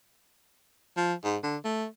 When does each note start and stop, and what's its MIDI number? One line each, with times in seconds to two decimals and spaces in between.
0.97 1.13 53
1.24 1.37 44
1.43 1.57 50
1.65 1.86 57